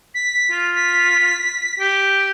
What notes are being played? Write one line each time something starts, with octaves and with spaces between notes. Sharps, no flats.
B6
F4
B6
G4